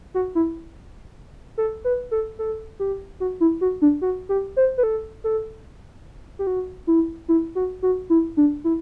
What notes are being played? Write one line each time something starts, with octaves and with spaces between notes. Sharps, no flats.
F#4
E4
A4
B4
A4
A4
G4
F#4
E4
F#4
D4
F#4
G4
C5
B4
A4
A4
G4
F#4
E4
E4
F#4
F#4
E4
D4
E4